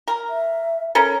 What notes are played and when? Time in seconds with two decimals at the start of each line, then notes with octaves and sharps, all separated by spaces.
0.08 A#4
0.29 E5
0.95 C#4 A4 A#4